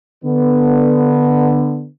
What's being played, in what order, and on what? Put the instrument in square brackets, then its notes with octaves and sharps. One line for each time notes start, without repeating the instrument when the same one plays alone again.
[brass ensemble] D3 B3